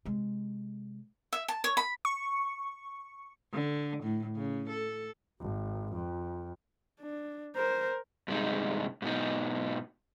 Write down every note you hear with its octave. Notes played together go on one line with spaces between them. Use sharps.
C3 G#3
E5
A5
C#5
B5
C#6
D3
A2
C#3
A4
G#1
F2
D4
A#4 C5
G2 C3 G#3 D#4
G#2 B2 D#4